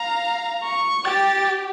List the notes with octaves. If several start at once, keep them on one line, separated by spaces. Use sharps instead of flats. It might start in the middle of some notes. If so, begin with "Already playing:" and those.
Already playing: F5 A#5
C#6
G4 A6